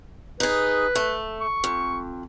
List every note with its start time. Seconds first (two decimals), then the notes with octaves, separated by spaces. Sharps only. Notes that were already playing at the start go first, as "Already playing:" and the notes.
0.40 D#4 G#4 B4
0.95 A3
1.41 C#6
1.64 F2